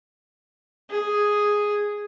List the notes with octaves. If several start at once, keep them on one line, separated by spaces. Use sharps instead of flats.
G#4